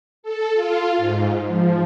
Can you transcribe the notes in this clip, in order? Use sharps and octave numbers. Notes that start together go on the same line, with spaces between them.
A4
F4
G#2
F3